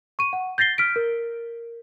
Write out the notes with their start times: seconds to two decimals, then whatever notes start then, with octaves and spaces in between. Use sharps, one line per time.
0.19 C#6 D#7
0.33 F#5
0.58 G6 A6 A#6 C7 G7
0.78 F6 B6 D7
0.96 A#4